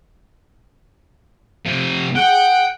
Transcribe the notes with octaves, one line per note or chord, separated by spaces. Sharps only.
C3 F3
G#4 F#5 G5